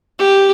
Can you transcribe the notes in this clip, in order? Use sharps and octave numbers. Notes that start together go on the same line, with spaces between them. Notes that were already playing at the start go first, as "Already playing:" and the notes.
G4